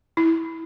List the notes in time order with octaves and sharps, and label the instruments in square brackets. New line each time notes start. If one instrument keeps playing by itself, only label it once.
[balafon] E4